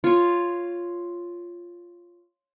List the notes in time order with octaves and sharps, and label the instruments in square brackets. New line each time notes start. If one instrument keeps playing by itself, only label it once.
[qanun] F4 C#5